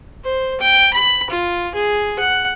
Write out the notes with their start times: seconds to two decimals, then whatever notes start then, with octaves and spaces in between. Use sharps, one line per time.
0.24 C5
0.60 G5
0.94 B5
1.30 F4
1.75 G#4
2.19 F#5